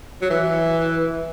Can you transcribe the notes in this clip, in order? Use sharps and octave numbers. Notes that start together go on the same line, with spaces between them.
F#3
E3